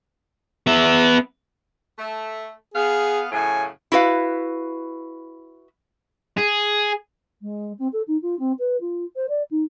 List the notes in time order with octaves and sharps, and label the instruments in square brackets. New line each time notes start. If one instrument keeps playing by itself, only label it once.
[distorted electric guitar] B3 E5
[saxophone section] A3
[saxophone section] B3 F5 [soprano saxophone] G#4
[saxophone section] F#2 A2 C#3 [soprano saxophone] G#5
[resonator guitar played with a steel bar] E4 F#4 B4 F5
[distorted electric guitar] G#4
[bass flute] G#3
C4
A4
D#4
F4
C4
B4
F4
C5
D5
D#4